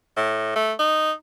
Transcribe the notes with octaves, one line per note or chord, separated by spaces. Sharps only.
A2
A3
D#4